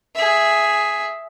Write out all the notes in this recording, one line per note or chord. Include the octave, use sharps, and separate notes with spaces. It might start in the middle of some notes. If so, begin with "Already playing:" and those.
G#4 E5